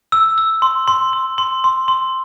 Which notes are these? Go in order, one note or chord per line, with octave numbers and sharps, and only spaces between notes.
E6
E6
C6
C6
C6
C6
C6
C6